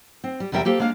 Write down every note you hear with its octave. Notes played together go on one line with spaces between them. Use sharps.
C4
G3
E2 C3 G3 A#4 E5 G5
A#3 G4 A4 C5
G#3 A#3 D4 F5